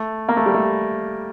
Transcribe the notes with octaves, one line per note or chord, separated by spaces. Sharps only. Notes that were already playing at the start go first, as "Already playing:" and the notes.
Already playing: A3
A#3
A3
G3
A3